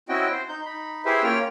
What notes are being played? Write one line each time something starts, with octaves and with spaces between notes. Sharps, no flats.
C4 C#4 E4 F#4 D#5 G5
C5
D#4 G6
D#4 B5
E4 G4 G#4 B4 C5 E5
A#3 C#4 F4 C#5 G5 F6